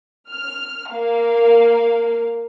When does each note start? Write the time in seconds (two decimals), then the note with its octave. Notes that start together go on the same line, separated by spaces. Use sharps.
0.29 F6
0.91 A#3 F5